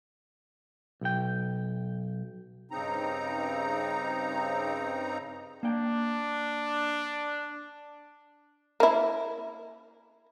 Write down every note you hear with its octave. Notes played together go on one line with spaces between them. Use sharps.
B1 G5
G2 C#3 C4 D#4 A#5
A#3 D4 G5
A#3 E4